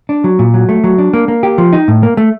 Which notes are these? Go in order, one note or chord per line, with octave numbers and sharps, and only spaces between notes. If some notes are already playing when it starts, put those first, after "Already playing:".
D4
F#3
A#2
F#3
A3
F#3
D4
A#3
A#3
G4
F3
D#4
A2
A#3
A3